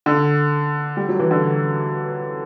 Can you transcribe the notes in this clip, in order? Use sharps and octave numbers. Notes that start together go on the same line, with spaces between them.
D3
G3
F#3
E3
D3